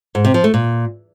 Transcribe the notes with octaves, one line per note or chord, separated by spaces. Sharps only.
G#2
C3
F3
A3
A#2